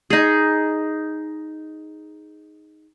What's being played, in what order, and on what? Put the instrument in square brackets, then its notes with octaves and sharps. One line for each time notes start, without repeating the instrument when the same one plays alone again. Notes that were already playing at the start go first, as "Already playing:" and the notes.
[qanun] D#4 G#4